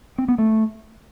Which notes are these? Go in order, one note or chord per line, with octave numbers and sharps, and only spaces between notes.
C4
B3
A3